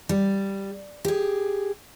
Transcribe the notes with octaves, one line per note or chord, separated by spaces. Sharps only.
G3
G4 G#4